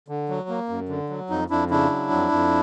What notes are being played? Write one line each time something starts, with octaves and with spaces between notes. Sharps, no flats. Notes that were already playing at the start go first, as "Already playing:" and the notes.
D3
F#3
A#3
F#2
D3
F#3
F2 D#4
F2 D4 E4
C#3 D4 E4
F#3
F2
F2